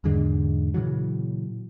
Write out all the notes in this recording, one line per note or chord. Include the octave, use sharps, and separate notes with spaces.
E2 G#2 D3 G#3
A#2 C#3 E3 F#3